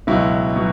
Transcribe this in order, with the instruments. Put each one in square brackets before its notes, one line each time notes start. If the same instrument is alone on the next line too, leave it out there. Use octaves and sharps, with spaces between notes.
[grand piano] C#2 B2 F#3 E4
B2 F#3